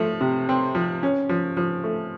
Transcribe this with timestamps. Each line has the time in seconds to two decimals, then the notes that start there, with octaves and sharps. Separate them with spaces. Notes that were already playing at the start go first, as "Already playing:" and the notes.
Already playing: F3 A3
0.21 C3
0.49 C4
0.75 F3
1.03 C#4
1.29 F3
1.57 F3
1.84 A3